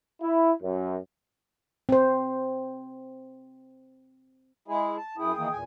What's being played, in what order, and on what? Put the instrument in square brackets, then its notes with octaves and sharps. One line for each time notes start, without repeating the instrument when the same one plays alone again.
[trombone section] E4
F#2
[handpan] C4 C5
[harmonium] G#3 E4 G#4
A5
[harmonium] F#2 E4 [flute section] G#4 G5 D#6
[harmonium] D#3 E3 A#3
E2 A#2 G#5